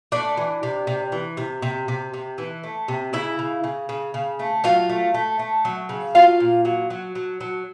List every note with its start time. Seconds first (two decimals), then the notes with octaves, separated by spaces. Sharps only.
0.12 A3 D4 D5
0.37 E3
0.63 C3
0.87 C3
1.12 E3
1.37 C3
1.62 C3
1.88 C3
2.14 C3
2.38 E3
2.63 A3
2.88 C3
3.13 C#3 E4 E5
3.39 C#3
3.64 C#3
3.89 C#3
4.14 C#3
4.39 A3
4.64 F#3 F4 F5
4.89 A3
5.14 A3
5.39 A3
5.65 F#3
5.89 C#3
6.15 F#3 F4 F5
6.40 A#2
6.65 F#3
6.90 F#3
7.15 F#3
7.41 F#3